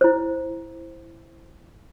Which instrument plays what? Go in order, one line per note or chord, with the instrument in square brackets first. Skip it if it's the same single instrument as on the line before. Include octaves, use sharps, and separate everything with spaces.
[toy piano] E4 C5